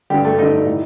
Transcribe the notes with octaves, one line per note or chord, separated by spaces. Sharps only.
G2 D3 G3 G4
A3 A4
G2 D3 D#4 D#5
A2